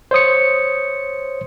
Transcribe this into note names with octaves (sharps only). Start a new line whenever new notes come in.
C5 C#5 D#6 C#7